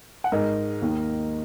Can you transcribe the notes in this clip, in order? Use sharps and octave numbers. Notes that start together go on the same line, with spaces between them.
F#5
G#2 G#3 A#4 D#5
D#2 D#3 A#3